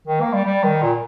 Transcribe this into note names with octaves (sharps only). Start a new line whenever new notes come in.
D#3
A#3
G3
G3
D#3
A#2